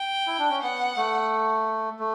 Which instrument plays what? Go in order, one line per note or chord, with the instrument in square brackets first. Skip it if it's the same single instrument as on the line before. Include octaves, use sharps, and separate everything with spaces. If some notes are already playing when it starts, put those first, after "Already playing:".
Already playing: [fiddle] G5
[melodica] E4
D4
C#4
[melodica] B3 [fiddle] F#5
[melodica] A3
A3